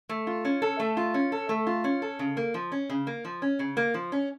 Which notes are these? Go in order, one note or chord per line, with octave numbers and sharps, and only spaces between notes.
A3
F4
C#4
A4
A3
F4
C#4
A4
A3
F4
C#4
A4
C#3
A#3
F3
C#4
C#3
A#3
F3
C#4
C#3
A#3
F3
C#4